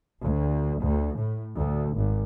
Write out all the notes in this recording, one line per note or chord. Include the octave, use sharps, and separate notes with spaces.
D2
D2
A2
D2
G#1